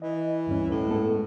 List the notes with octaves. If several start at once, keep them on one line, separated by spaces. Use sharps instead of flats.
E3 D#5
D2 G2 C#4
A2
G#3 B3 A4